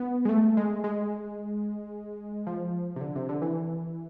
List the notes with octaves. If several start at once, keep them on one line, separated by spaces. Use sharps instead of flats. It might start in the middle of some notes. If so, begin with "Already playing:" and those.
Already playing: B3
G#3
A3
G#3
G#3
F3
C3
D3
C3
D3
E3